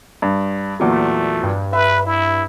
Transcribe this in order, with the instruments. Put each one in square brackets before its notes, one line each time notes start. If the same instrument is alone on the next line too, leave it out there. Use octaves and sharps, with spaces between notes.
[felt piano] G2
[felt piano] E2 A#2 F#3 [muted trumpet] A3
[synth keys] G2
[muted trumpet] B4 [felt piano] E5
[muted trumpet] E4